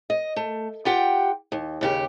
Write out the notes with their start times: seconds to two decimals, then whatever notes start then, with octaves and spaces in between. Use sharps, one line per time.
0.10 D#5
0.36 A3
0.85 F4 G4 F#5 G5
1.52 D#2
1.81 D#2 C#3 G4